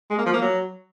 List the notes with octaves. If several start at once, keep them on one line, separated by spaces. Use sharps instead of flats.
G#3
A#3
F3
A#3
F#3